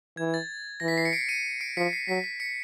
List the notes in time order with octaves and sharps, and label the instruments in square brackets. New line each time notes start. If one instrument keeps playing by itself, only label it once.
[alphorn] E3 [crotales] G#6
[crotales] A6
[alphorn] E3 [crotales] A#6
[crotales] B6
C7
C#7
C7 D7
C#7 D#7
C7 D7
[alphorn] F3 [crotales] B6 C#7
[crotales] C7
[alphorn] F#3 [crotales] B6
[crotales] B6
B6 C#7